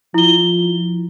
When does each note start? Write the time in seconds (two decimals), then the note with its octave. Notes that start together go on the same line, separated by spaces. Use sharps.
0.14 F3 E4 G7